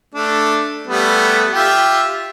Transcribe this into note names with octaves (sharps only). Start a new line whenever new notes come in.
A3 D4
G3 A3 B3
F4 G4 E5